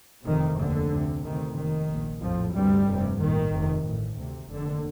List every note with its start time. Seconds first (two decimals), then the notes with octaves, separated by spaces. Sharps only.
0.25 F1 F2 C3 D#3
0.58 F1 D#2 D3
0.91 D2 C3
1.23 D2 C3 D#3
1.56 F1 D#2 D#3
1.88 A#1 A#2
2.21 A#1 F2 A2 F3
2.53 D2 G2 C3 G3
2.85 F1 F2 C3
3.18 A#1 A2 D#3
3.52 F1 F2 C3
3.84 A1 A2
4.16 D2 C3
4.48 F1 D#2 D3